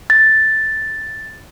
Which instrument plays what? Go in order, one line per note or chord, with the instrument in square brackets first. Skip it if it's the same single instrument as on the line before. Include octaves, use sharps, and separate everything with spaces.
[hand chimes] A6